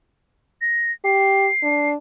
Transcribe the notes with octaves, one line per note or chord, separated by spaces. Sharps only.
A#6
G4 C7
D4